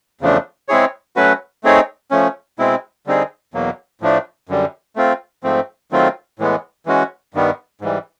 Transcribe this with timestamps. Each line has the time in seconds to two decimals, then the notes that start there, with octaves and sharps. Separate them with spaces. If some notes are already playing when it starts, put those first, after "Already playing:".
0.21 E2 C#3 F3 A3 D4
0.68 G#3 C4 E4 G#4 C#5
1.16 F#3 A3 C#4 F#4 B4
1.64 A3 C4 D#4 G#4 C#5
2.11 F3 A3 C#4
2.59 B2 G#3 C4 E4
3.07 D3 G3 C4 D#4 G#4
3.54 E2 B2 F#3 A#3
4.01 A2 F3 A3 D4
4.49 F#2 D3 G3
4.96 A3 C4 F4
5.43 G#2 F3 A3 C4
5.91 D#3 F#3 A3 C4 F4
6.39 A2 E3 G#3 B3
6.86 E3 G#3 C#4 F#4
7.34 G2 D#3 G3 B3
7.81 G#2 E3 G3